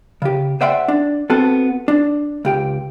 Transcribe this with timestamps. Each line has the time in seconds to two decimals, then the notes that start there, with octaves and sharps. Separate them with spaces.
0.22 C#3 G4
0.61 C5 D5 E5 F#5 G5 C6
0.88 D4
1.30 B3 C4 F#4 A4 A5
1.88 D4
2.45 C#2 G4 G5